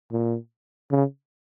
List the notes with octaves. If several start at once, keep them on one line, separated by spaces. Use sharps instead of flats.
A#2
C#3